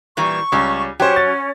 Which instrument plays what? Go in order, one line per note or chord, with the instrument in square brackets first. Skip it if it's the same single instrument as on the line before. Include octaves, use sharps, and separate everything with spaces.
[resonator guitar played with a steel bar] A#2 E3 G3 [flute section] C#6
[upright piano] C#2 [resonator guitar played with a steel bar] G3 C#4
[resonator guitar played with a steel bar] F#3 [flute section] C#4 [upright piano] G4 C5
[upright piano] A6